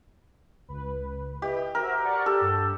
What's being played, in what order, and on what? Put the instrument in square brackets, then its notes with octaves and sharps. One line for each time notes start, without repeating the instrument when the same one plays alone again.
[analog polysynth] C#2 B4
[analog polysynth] E4 B4 D#5 [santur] G4
[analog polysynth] F#4 C5 E5 [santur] A#4
[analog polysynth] D5 F#5 C#6
[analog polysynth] G4 [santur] A4
[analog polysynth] G2